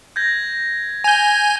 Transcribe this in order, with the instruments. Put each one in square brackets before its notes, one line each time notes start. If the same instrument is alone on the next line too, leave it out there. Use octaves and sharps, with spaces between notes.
[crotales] G6 G#6 A#6
[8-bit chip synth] G#5 G6 [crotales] F7